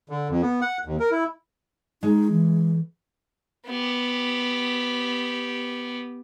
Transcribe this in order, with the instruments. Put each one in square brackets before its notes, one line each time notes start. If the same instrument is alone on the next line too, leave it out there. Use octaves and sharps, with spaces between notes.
[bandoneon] D3
F2
B3
F#5
D#2
A#4
E4
[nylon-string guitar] G#3 [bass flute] D#4
[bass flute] E3
[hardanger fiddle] B3 G4